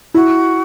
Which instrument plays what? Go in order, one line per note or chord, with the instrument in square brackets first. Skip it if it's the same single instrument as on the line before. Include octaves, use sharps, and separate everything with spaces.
[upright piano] E4 [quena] F#4